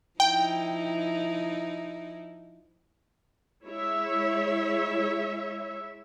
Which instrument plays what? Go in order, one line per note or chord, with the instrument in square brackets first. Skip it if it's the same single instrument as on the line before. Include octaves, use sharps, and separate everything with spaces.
[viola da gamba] F3 D#4 E4 [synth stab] G5
[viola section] G#3 E4 C#5 E5